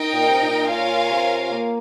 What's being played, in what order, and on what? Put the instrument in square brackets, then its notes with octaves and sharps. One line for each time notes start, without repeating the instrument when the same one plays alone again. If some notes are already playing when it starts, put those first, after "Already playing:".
Already playing: [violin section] D#4 A#4 D#5 G5
[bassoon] A#2
C3
A#2
[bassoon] A#2 [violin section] F4 A#4 C#5 F5 G#5
[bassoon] C3
A#3